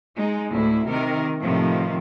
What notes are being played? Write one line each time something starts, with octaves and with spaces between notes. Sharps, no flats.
G#3 D#4
D2 A2 E4
C3 D#3 A#4
A2 C3 D#3 F3